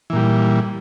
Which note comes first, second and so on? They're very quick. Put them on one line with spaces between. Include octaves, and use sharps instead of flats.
E3 A#2 G3